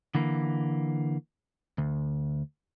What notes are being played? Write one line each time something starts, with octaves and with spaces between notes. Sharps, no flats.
D3 E3 A#3
D2